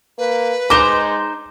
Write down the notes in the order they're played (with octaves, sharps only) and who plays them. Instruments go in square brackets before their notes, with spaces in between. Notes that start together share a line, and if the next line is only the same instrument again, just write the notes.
[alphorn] A#3 [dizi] B4
[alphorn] G#3 [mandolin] D#4 C5 A#5 [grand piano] D6 G7